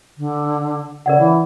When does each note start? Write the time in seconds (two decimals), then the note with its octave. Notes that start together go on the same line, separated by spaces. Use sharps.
0.18 D3
1.06 C#3 A#4 D5 F#5
1.19 E3